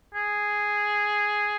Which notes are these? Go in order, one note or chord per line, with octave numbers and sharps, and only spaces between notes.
G#4